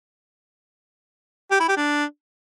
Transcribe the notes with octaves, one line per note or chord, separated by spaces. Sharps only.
G4
E4
G4
D4